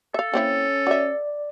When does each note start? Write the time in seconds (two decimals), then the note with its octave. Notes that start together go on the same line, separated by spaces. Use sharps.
0.14 A4 E5 F5
0.34 A#3 C4 C#4 E4
0.87 F#4 D5 E5